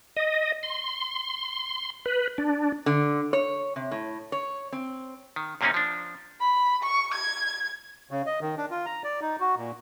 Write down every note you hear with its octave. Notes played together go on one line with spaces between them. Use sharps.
D#5
C6
B4
D4
D3
C#5
C3
A2
C#5
C4
D#3
F#2 C3 A#3 C4 C#4 D#4
F3 D4
B5
C#6
G#6
C#3
D#5
D#3
D4
F4
A#5
D5
D#4
F#4
A#2